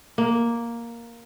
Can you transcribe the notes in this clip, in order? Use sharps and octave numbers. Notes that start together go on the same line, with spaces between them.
A#3